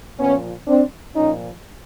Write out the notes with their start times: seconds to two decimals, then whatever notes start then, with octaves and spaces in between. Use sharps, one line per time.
0.19 A#2 F3 B3 C#4
0.67 C4 D4
1.15 A#2 F3 C#4 D#4